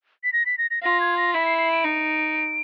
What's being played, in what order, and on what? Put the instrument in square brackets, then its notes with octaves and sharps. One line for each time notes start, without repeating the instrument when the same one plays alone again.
[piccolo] B6
A#6
B6
A#6
A#6
[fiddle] F4 [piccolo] A#6
[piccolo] G#6
A#6
[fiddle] E4 [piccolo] B6
[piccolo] C7
C7
D7
[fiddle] D#4